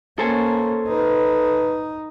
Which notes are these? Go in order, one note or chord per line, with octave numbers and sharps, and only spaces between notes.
A#3 C#4 A4 C5 G#5
D#4 B4